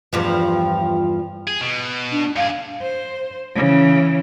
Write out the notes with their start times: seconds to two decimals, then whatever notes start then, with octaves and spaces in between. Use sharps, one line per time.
0.13 E2 G2 F3
1.47 G#4
1.61 B2
2.12 D4
2.36 G2 G#4 F5
2.82 C5
3.55 C#3 E3